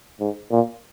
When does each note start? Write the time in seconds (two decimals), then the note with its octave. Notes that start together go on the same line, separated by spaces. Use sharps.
0.20 G#2
0.51 A#2